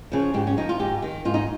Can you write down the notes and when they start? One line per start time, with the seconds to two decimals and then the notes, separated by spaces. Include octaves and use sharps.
0.12 C#3 F3
0.34 G#2 G4
0.47 C#4
0.57 F3 D#4
0.69 F4
0.80 G#2 G4
1.02 D#3
1.25 G#2 F4
1.34 D#4